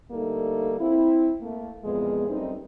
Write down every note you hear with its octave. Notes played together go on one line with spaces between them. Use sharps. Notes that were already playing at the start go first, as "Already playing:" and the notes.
D3 G3 A3 A#3 D#4 A4
C4 E4
A3 A#3
F2 A#2 E3 G#3 B3
F#2 G3 A3 C4 D#4